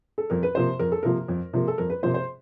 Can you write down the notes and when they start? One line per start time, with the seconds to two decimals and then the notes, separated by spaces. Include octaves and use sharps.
0.18 A4
0.30 F2 A#4
0.43 B4
0.55 C3 F3 A#3 C5
0.79 F2 A#4
0.92 A4
1.03 C3 F3 A#3 A#4
1.28 F2
1.53 C3 F3 A#3
1.68 A4
1.78 F2 A#4
1.90 B4
2.03 C3 F3 A#3 C5
2.14 C5